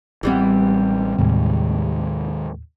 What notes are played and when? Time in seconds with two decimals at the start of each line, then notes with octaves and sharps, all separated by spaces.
0.23 A1 E3 G3 B3 C4
1.18 D#2 A2 C3 D#3 G#3 C4